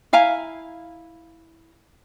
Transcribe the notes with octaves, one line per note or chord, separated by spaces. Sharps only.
E4 F5 G#5 A#5